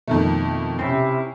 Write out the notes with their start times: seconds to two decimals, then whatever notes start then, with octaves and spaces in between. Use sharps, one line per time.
0.07 F2 B2 D#3 A3
0.79 C3 C4 C#4 E4